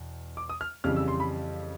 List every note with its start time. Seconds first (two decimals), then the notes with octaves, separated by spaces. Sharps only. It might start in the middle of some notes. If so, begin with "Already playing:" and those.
Already playing: E2 B2
0.37 D6
0.49 D#6
0.61 F6
0.84 F2 C#3 E3 G3 F6
0.96 E6
1.08 C6
1.20 B5